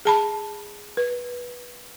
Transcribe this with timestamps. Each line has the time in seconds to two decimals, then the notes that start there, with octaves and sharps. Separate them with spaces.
0.05 G#4 A5 B5
0.97 B4